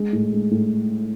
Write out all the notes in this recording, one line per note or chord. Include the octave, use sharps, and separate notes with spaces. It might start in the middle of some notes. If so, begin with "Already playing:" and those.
Already playing: G#3
A2
G#3
A2